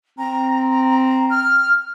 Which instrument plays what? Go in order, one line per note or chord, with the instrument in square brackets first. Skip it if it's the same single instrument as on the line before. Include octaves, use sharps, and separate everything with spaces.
[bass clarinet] C4 [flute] A#5
[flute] F6